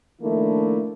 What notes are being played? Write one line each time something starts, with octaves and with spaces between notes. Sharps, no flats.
D#3 F3 A3 A#3 D4 E4